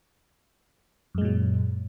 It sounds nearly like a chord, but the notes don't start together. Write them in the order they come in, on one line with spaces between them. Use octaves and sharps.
F#2 G#3 A#2 F#3